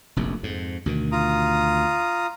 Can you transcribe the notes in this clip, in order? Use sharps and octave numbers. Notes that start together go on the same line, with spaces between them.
F1 A#1 F#2
F2 G#2
D2 B2 D#3
F4 A#5 D#6